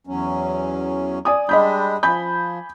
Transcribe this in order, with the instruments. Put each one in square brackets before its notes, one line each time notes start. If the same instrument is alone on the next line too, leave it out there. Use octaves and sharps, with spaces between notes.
[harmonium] E2 F#3 C#4
[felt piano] D5 G#5 D#6
[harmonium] G3 G#3 D4 [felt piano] D#5 B5 G6
[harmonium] F3 [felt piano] G#5 B5 G6